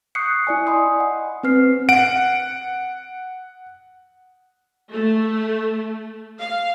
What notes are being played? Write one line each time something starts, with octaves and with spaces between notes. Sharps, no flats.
C#6 D#6 F#6 G6 C7 C#7
E4 D5 G#5
D#5 G#5 B5 C6 D#6
F#5
C4 B4 F6 C7
F#5 D7
A3
F5